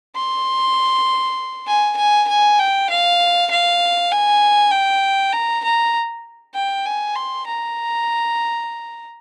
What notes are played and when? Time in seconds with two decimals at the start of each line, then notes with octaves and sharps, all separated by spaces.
0.15 C6
1.67 G#5
1.97 G#5
2.28 G#5
2.59 G5
2.90 F5
3.51 F5
4.12 G#5
4.71 G5
5.33 A#5
5.64 A#5
6.55 G5
6.86 G#5
7.16 C6
7.47 A#5